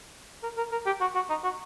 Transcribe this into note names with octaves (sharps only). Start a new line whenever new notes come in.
A#4
A#4
A#4
G4
F#4
F#4
D#4
F#4